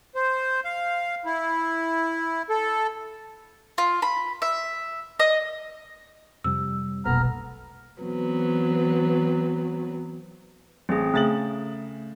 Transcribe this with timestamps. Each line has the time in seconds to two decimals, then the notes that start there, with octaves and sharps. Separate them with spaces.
0.15 C5
0.64 F5
1.25 E4
2.50 A4
3.78 F4
4.02 B5
4.42 E5
5.20 D#5
6.44 F2 C3 G3 E6
7.05 F1 B1 A#3 B3 A4 B4 A#5 F6
8.01 E3 F#3 B3 C4
10.89 A1 C4 G#4
11.14 C#3 A3 A6 F#7